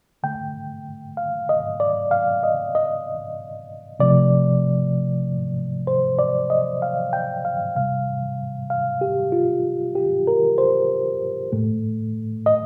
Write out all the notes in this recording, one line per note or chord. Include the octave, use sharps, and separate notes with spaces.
D3 A3 G5
F5
D#5
D5
F5
D#5
D#5
C3 F3 A3 D5
C5
D5
D#5
F5
G5
F5
C3 G3 F5
F5
G4
F4
G4
A#4
C5
A2 A3
D#5